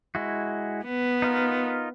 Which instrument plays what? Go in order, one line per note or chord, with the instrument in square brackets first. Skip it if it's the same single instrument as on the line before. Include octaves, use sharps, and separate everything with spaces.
[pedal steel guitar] G#3 E4 F#4
[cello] B3
[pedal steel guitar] D#4 F4 A#4